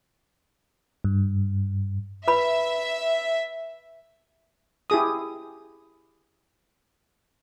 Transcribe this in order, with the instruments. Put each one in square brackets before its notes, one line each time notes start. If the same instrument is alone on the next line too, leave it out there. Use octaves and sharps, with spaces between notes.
[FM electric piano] G2
[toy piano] B4 B5 [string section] E5
[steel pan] E4 G4 G#4 D#6